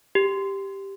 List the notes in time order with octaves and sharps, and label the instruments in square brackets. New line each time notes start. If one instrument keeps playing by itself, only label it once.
[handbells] G4